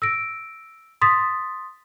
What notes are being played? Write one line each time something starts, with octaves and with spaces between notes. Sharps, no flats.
E6 A#6 D7
C6 D#6 A6 B6